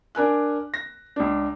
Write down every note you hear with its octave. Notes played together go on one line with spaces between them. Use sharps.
D4 A#4 G#5 F#6
A#6
C#2 D4